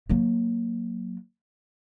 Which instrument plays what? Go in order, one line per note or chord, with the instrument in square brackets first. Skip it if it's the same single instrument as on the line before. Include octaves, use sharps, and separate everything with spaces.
[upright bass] F#3 A#3